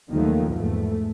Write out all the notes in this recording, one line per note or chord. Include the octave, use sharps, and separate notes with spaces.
D#2 D#3 F3 F#3 A3 A#3
E2 G#2 A3